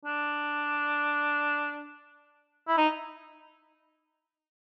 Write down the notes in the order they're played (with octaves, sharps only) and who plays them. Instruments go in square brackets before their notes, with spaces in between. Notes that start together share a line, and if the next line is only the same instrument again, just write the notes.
[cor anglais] D4
E4
D#4